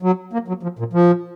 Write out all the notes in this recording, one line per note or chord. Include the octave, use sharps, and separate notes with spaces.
F#3
A#3
F#3
F3
A#2
F3